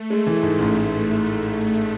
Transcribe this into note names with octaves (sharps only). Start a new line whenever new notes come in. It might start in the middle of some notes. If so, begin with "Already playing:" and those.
Already playing: A3
G#3
E3
G#2
A1